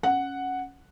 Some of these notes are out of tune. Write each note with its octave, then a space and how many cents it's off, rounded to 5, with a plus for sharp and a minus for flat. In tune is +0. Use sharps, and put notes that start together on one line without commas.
C#4 +0 F#5 +0